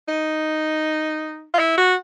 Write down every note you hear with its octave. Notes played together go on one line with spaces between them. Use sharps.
D#4
F4
E4
F#4